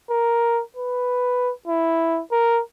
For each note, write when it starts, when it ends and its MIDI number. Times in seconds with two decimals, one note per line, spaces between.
0.10 0.62 70
0.76 1.52 71
1.68 2.21 64
2.31 2.61 70